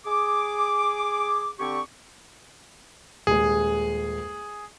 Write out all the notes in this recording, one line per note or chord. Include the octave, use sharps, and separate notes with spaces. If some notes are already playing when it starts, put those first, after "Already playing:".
G#4 D6
D3 C4 G4 D5 C#6
D#1 G#3 G#4